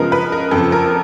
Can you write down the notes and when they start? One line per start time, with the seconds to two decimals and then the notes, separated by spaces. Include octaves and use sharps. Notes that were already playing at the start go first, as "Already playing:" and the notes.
Already playing: C#3 F3 G#3 B3 A#4
0.12 B4
0.32 A#4
0.51 F2 C#3 F3 A4
0.72 A#4